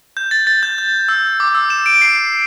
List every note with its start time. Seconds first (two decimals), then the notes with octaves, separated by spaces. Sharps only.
0.17 G6
0.31 A6
0.47 A6
0.63 G6
0.78 G6
1.09 E6
1.40 D6
1.55 E6
1.70 E7
1.86 D7
2.01 C7